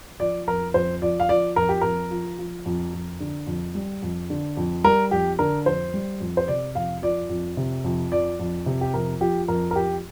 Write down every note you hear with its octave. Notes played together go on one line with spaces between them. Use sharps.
F3 D5
F2 A#4
F2 C5
F3 D5
F5
F3 D5
F2 A#4
G4
F2 A#4
F3
F3
F2
F2
D3
F2
G3
F2
D3
F2
G3 A#4
F2 G4
D3 A#4
F2 C5
G3
F2
C5
C3 D5
F2 F5
F3 D5
F2
C3
F2
F3 D5
F2
C3
G4
F2 A#4
F3 G4
F2 A#4
A#4
F3 G4